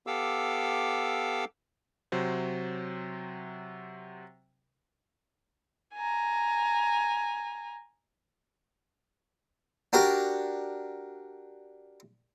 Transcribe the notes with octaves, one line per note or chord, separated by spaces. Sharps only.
B3 G4 A4 F5 D6 E6
C3 F#3 C5
G#5 A#5
D4 F#4 G4 A#4